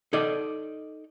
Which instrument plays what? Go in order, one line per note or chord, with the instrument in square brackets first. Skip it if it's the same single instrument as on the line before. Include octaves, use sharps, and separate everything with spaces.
[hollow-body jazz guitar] D#4 A4 D5 D#5